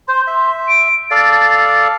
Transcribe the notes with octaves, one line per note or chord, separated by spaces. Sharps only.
C5 C6
E5
D7
A4 D5 F5 A6